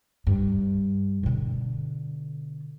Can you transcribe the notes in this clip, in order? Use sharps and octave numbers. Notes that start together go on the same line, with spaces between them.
G2
B2 D3